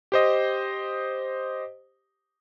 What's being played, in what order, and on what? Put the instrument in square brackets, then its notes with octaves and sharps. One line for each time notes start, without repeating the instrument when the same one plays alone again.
[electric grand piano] G4 C5 D#5